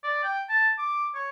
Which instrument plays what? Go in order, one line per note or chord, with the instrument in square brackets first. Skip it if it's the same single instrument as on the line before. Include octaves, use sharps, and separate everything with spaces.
[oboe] D5
G5
A5
D6
C#5